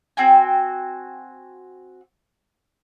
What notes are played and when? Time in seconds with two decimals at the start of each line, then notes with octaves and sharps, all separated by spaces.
0.17 C4 F#4 G5 G#5